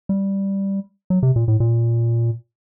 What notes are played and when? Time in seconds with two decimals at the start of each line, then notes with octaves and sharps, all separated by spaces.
0.09 G3
1.10 F#3
1.23 C3
1.36 A#2
1.48 A2
1.60 A#2